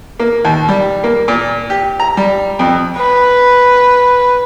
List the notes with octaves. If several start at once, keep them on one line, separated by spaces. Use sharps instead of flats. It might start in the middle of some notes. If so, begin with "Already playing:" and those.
A#3
D#2
G3
A#3
A#2
G4
A#5
G3
F2
B4